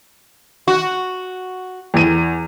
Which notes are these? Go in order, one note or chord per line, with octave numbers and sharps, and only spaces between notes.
F#4
E2 D#7